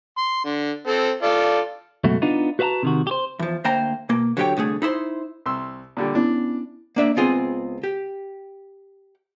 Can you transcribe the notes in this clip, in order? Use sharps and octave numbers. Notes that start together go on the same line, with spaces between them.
C6
D3
C4 A4
F4 A4 D5
C#2 F#2 B2 A3 F#4
B3 D4 D#4 F4
F#4 B4 C5 F5 A5 A#5
C3 D#3 F#4
G4 C5
E2 F3
D2 A#3 C5 G5 A#5
B2 A#3
D3 F#3 F#4 G4 C#5 G5
C2 D3 A3 G#4
D#4 E4 C5 C6
C2 C6 E6
A#2 D3 G3
B3 C#4 D4 E4
A#3 D4 E5
C#2 B3 C4 F4 G#4
G4